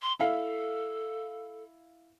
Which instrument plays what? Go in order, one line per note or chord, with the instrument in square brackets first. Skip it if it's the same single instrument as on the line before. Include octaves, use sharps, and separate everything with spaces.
[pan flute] C6
[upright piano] E4 E5 F5 [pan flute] A4